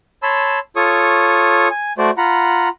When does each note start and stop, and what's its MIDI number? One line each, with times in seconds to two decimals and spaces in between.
0.23 0.59 73
0.23 0.59 81
0.23 0.59 83
0.23 0.59 84
0.23 0.59 88
0.76 1.68 65
0.76 1.68 69
0.76 1.68 73
0.76 1.68 85
0.76 1.68 87
1.71 1.93 80
1.98 2.11 57
1.98 2.11 66
1.98 2.11 72
1.98 2.11 74
2.17 2.69 65
2.17 2.69 78
2.17 2.69 82
2.17 2.69 83